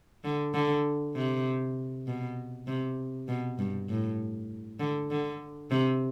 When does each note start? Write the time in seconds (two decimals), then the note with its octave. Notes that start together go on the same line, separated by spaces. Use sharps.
0.24 D3
0.54 D3
1.15 C3
2.07 B2
2.67 C3
3.28 B2
3.59 G2
3.89 A2
4.80 D3
5.11 D3
5.71 C3